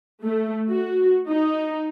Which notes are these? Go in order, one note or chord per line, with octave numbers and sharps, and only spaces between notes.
A3
F#4
D#4